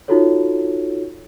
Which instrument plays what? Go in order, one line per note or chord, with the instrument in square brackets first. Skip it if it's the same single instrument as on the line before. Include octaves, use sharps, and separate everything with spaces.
[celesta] D#4 F4 F#4 A4 C#5